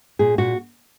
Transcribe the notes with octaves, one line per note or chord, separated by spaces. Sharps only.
A#2 G#4
A#2 F#4